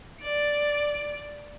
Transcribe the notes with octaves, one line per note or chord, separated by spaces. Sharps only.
D5 D7